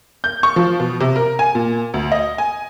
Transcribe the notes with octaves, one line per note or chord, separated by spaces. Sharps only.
G6
C#6
F3
B2
C3
A#4
G#5
A#2
D2
D#5
G#5